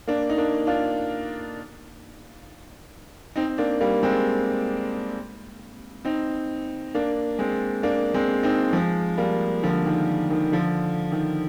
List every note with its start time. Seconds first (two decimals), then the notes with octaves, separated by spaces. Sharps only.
0.07 A#3 D4
0.29 D#4
0.37 A#3 D4
0.67 D4 F4
3.36 C4 D#4
3.58 A#3 D4
3.81 G3 A#3
4.03 G#3 C4
6.05 C4 D#4
6.95 A#3 D4
7.39 G#3 C4
7.83 A#3 D4
8.14 G#3 C4
8.43 C4 D#4
8.73 F3 G#3
9.18 G3 A#3
9.63 D3 F3
9.86 D#3
10.31 D#3
10.52 D3 F3
11.12 D#3